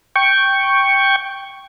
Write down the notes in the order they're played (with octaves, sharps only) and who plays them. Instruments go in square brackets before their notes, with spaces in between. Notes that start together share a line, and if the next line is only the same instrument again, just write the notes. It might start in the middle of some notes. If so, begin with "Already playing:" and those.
[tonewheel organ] G5 C#6